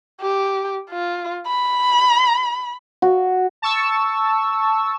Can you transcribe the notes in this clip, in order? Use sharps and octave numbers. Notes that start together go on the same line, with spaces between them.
G4
F4
B5
F#4
A5 C#6 E6